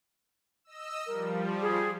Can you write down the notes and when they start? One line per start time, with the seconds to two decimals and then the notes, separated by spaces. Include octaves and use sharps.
0.65 D#5 E6
1.07 F3 G3 A#4
1.61 G#4